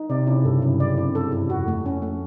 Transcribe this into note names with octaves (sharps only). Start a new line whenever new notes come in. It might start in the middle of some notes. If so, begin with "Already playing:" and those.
Already playing: D#4
C3 D5
C#3 E4
G2 A4
F#2 E4
D5
E4
A4
E4
F2 F#4
A3
C#4
A3